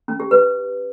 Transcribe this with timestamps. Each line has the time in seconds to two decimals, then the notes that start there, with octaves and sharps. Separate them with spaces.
0.08 C#4
0.20 G4
0.31 B4